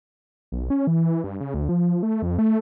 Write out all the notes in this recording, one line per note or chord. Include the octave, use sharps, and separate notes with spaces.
B1
C#4
E3
G2
C#3
D2
F3
A3
F2
A3